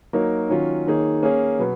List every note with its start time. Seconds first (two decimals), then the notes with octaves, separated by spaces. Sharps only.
0.13 F#3 A#3 D#4 A#4 C#5
0.49 D#3 F#3 C#4 F4
0.86 D#3 A#3 D#4 G#4 C#5
1.23 A#3 C#4 G#4 C#5
1.59 B2 F#3 B3